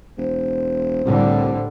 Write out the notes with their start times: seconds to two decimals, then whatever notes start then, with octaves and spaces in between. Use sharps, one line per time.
0.18 E1 C5
1.05 C2 A2 D3 G3